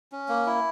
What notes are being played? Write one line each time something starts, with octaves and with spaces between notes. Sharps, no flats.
C#4
A#3
E4